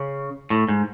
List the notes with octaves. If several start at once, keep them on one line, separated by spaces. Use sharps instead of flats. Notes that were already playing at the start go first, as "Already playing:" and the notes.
Already playing: C#3
A2
G#2